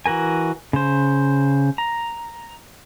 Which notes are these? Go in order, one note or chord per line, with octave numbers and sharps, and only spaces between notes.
E3 F#4 A#4 G#5
C#3 C5
A#5